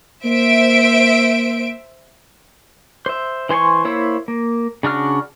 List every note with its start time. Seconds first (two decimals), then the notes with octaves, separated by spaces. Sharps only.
0.25 A#3 C5 E5 D7
3.06 C5 E5
3.49 E3 C5 G#5 C6 C#6
3.85 A#3 E4 C5 C#5 E5
4.28 A#3
4.83 C#3 D4 F#4 F6